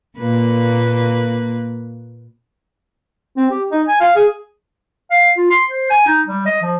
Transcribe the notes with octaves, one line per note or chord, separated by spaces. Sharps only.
A#2 A#3 B4
C4
G4
D#4
G#5
F5
G#4
F5
F4
C6
C5
G#5
D#4
G3
D#5
F3